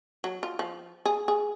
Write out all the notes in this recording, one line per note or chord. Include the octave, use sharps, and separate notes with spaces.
F#3
F4
F3
G#4
G#4